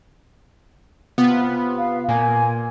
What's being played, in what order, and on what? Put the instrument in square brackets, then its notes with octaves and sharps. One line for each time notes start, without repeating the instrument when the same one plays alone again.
[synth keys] C3 B3 F4
[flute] F5
[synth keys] A#2 A#3 [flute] G#5